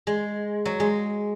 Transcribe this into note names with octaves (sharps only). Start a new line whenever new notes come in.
G#3
F#3
G#3